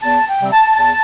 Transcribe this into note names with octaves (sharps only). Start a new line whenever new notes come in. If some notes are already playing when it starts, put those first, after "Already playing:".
E2 A5
G5
C3 G3 C4
A5
E2 A5